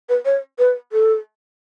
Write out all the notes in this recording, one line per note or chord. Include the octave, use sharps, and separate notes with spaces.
B4
C#5
B4
A4